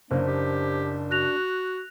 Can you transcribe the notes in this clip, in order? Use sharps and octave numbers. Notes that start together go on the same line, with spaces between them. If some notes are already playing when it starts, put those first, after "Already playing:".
F#1 A#3 D4 C5
G4
F#4 F#6 A#6 F7